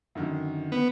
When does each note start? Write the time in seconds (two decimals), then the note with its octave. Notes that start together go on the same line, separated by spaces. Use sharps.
0.15 F#2 D3 D#3
0.72 B3